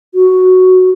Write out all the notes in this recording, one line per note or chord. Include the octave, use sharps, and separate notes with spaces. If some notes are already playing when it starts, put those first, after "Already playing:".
F#4